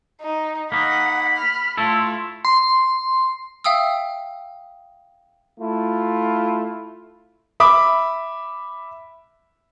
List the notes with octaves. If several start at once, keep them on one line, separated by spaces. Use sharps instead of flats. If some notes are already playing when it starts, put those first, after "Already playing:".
D#4
A#3 D#4 F#5 B5
F6
A3 E4 F4 A4
C6
E5 F5 G5 D#6 E6
A3 E4 F4
E5 B5 D6